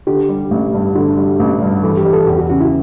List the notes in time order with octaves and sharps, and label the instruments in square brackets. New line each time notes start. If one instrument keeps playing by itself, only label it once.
[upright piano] D3 [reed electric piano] G4
[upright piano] G3
A1
G2
[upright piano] D3 [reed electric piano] F#4
[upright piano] G3
A1
G2
[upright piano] E3 [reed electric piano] A4
[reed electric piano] G4
[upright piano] G3
[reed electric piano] A4
[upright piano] E2 [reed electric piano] G4
[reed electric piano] F#4
[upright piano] C#3 [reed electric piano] F#4
[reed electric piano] E4